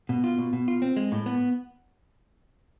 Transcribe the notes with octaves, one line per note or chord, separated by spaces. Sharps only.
B2
F4
B2
B2
F4
C4
G#3
A2
B3